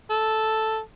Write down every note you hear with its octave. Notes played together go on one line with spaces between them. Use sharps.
A4